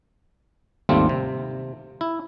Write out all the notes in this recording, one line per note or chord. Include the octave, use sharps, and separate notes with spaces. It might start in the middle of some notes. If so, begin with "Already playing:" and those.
G#1 D#2 G3 A3 C4 F4
C3
E4